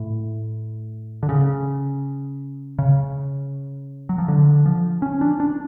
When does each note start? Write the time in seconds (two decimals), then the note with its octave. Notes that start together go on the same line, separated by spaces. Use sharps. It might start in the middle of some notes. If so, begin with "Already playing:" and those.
Already playing: A2
1.23 D3
1.29 C#3
2.79 C#3
4.09 F#3
4.18 F3
4.28 D3
4.66 F3
5.02 C#4
5.21 D4
5.40 D4